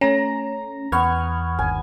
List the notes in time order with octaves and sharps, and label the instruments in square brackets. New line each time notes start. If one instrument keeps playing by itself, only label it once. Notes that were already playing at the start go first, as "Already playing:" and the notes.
[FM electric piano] A3 C#4 [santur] A#5
[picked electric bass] E2 [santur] B3 [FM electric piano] C#6 F6 G#6
[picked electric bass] G1 D#2 [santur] G#5